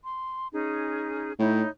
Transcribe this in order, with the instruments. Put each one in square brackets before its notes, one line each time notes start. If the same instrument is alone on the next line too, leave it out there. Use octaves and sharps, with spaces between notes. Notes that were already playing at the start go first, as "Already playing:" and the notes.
[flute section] C6
C#4 D#4 G#4
[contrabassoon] A2 [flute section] D#4 E4 C#5